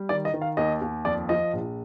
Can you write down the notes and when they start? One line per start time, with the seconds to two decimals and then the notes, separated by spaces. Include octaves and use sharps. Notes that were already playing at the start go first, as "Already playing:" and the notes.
Already playing: G3
0.09 D#3 D5
0.25 D#5
0.34 D#3
0.42 F5
0.57 D#2 D#5
0.82 D#2
1.05 F2 D5
1.29 F3 D#5
1.53 A#1